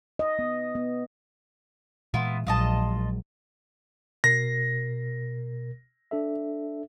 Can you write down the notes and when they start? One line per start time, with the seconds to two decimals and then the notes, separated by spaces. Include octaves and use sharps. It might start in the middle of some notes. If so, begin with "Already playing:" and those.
0.19 D#5
0.39 B3
0.75 B3
2.14 A#2 E3 G#3 B3 E4 F4
2.47 A#1 F#3 G#3 F4 D#5 A5
4.24 B2 A#4 A#6 C7
6.11 D4 A4 E5